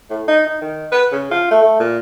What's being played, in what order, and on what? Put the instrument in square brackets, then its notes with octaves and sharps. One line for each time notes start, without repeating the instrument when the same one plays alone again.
[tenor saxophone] A2
D#4
D#4
D#3
B4
C#3
F4
A3
A3
A#2